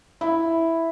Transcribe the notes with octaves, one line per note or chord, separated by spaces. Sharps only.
E4